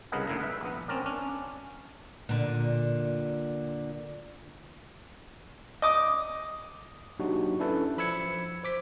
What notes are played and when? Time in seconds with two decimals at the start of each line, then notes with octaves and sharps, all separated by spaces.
0.12 C2 C#3 A#4 B4 D#5 F#5
0.27 G#1 A2 D3 E4 A#4
0.40 B4 E5
0.61 A#1 B3
0.88 C4 C#4 A#4 D5
1.06 C#4 D4
2.29 A#2 D3
5.82 D#5 D6 D#6
7.20 F#3 A#3 D4 D#4 F#4 G4
7.59 C#4 D4 E4 A4 B4
7.98 F3 B5 E6 G#6 C#7
8.64 C5 D6 B6